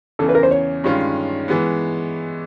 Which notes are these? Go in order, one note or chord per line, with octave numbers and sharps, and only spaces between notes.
E2 C#3 E3 A4
B4
A#4
C5
C#5
G2 D#3 G#3 C#4 F4
E3 G#3 B3